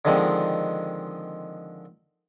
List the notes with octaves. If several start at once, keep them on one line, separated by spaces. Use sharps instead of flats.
D3 D#3 F3 G#3 C4